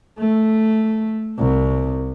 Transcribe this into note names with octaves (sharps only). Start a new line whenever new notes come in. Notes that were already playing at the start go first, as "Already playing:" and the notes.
A3
C2